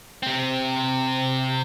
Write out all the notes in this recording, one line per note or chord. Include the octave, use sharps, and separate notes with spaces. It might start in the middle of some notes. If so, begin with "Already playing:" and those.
C3 C4